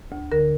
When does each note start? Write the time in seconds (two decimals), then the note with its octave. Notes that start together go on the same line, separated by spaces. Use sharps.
0.12 D2
0.32 D3 A#4